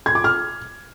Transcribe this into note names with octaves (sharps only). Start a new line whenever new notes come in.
G#6
D6
F6